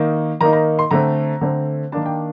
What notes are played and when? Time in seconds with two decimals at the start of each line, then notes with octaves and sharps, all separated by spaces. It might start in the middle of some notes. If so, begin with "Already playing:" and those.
Already playing: D#3 A#3 D#4
0.41 D#3 A#3 D#4 A#5
0.53 A#5
0.79 C6
0.91 D3 A3 C4 A#5
1.41 D3 A3 C4
1.92 D#3 A#3 D4 A5
2.06 G5